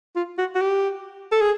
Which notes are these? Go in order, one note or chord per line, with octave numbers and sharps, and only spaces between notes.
F4
F#4
F#4
G4
A4
G#4